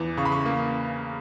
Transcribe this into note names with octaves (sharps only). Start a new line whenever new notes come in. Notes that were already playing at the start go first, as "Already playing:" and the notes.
Already playing: E2 E3
C#3 C#6
B5
C#6
A#3